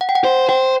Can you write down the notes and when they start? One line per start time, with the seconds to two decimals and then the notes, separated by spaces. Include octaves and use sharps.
0.01 F#5
0.09 G5
0.15 F#5
0.24 C5
0.49 C5 G5